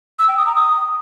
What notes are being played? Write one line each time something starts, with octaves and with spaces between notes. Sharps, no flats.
E6
G5
D#6
A#5
D#6